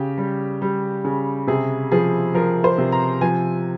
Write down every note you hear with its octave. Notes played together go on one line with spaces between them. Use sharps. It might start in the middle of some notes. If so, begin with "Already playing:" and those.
Already playing: C#3 G4
G3
G3
C#3
C3 G#4
F3 G#4
F3 A#4
C5
C3
A#5
F3 G#5